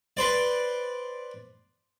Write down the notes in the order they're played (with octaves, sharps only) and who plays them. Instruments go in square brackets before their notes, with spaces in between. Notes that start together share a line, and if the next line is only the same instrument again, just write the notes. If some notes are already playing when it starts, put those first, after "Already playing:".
[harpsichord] B4 C5 D5